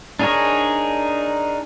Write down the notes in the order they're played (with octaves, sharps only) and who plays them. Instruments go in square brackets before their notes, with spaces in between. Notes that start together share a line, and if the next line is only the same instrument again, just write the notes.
[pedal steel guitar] D4 D#4 G#4 A#4 C#5